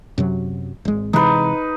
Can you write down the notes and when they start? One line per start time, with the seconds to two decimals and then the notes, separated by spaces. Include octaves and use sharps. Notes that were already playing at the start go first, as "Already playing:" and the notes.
0.18 F#2 C3 F#3
0.85 G#1 G#3
1.13 C3 E3 G#3 D#4 B4